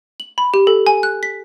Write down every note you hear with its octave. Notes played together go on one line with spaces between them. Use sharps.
F#7
B5
G4
A4
G#5
F#6
B6